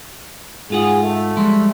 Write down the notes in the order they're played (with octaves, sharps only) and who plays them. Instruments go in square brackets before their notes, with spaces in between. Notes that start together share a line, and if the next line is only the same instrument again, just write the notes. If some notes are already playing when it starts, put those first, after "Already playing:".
[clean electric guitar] G#2 F4 F#5 [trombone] G#4
[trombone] A3
[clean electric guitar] F3 G3 G#3